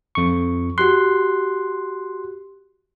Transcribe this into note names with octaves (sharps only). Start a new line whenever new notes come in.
F2 C#6
F#4 G4 C6 F#6